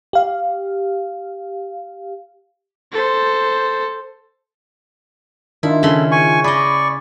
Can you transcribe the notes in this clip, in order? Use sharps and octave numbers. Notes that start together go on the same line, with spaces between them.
G4 F5
A4 C5
D#3 D4 E4 F4
C#3 A4 B5 C6
G#5 C#6
G#4 D5 D#5 B5 C#6